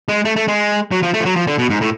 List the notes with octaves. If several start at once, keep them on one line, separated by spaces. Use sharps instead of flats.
G#3
A3
A3
G#3
F#3
F3
A3
F3
F#3
F3
D3
B2
G#2
A2